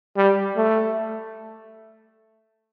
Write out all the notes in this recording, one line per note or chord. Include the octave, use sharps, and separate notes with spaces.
G3
A3